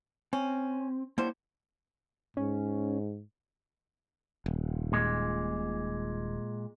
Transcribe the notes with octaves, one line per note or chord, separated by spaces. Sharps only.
C4 C#4
D3 G3 A#3 E4 C5 C#5
G#2 C#4
D#1
A#2 G#3